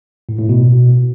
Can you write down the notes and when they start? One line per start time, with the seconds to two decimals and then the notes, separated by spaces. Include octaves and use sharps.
0.29 A2
0.39 A2
0.49 B2